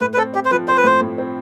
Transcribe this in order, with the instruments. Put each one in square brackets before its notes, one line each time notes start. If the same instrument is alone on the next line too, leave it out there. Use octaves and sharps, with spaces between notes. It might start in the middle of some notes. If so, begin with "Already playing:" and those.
[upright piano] A2 [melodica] B4
[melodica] B4
[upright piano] C4 [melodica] A4
[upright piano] C4 [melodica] G4
[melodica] C5
[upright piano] F3 [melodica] B4
[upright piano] C4 [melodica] C5
[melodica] B4
[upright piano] A2 [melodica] C5
[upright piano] A2
C4